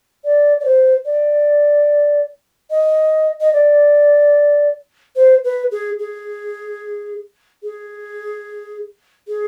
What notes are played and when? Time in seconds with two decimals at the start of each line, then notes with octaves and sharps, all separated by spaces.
0.24 D5
0.60 D5
0.65 C5
1.05 D5
2.70 D#5
3.40 D#5
3.53 D5
5.16 C5
5.44 B4
5.71 G#4
5.99 G#4
7.63 G#4
9.28 G#4